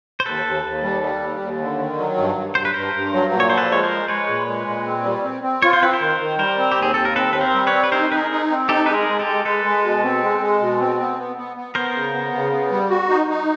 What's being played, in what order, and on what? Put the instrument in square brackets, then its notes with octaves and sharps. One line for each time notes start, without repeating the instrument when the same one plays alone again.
[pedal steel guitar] C5
[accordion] D#2 [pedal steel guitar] A4 B4
[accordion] D#2
D#2
G3
G3
D#2
D#2
D3
D#3
F#3
G2
G2
[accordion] G2 [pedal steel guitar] C5
[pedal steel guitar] B4
[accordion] G2 [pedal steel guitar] A#4 C5
[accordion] G2
F#3
A#2
[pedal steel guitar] C#5
[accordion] F3 [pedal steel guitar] C5
[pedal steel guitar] A4 B4
[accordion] G#3 [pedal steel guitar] C#5
[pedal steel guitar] A#4 C5
[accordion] G#3
[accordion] G#3 [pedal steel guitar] B4 C#5
[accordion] A#2
G#3
A#2
C4
G3
C4
C4
[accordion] F4 [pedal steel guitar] C#5
[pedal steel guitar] C5
[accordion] C4 [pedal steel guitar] B4
[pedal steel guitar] A#4 C5
[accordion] D#3
D#3
[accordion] G3 [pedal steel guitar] A#4 C5
[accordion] C4
[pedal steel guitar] G4
[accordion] D#2
[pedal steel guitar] G#4
[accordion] D#2 [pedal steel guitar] A4
[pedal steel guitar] A#4
[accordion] C4 [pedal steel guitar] A4 B4
[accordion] C4 [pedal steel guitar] B4
[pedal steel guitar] A#4 C5
[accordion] G3
[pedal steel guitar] B4 C#5
[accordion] C4
[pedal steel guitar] B4
[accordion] D#4 [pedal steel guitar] A#4 C5
[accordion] D#4 [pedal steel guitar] B4
[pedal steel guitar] G#4 A#4
[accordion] D#4
C4
[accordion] D#4 [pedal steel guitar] G4 A4
[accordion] G#3 [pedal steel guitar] B4
[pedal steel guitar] G#4 A#4
[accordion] G#3
[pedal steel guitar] G4 A4
[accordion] G#3
[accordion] G#3 [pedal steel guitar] A4 B4
[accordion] G#3
B2
C4
G#3
G#3
B2
C4
B3
B3
B3
B3
[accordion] B3 [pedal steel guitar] A#4 C5
[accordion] C#3
B3
C#3
B3
G3
F#4
D#4
D#4